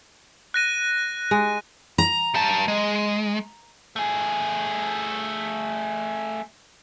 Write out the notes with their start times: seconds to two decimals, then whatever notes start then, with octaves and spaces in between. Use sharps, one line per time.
0.54 F#6 A#6 D#7
1.31 G#3
1.98 A#5
2.34 G3 A5
2.68 G#3
3.96 A3 G#4